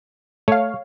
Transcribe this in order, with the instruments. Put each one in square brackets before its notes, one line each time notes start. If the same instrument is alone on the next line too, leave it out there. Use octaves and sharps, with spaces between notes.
[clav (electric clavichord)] A3 [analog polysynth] C#5 F5